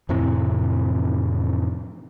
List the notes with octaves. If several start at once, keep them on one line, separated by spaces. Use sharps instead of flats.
F2 A2 C3 E3